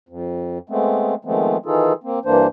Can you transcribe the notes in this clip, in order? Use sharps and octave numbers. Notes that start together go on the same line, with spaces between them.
F2
G#3 A3 B3 C4
D#3 F3 G#3 A3 B3 C4
D#3 E3 D#4 F4 G#4 A4
A#3 C4
G2 E3 A#3 D4 C5